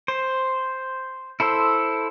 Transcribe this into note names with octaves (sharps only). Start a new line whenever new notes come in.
C5
E4 A4 C5